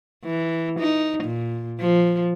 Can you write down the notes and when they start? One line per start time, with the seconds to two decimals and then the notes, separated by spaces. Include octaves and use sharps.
0.25 E3
0.79 D#4
1.24 A#2
1.80 F3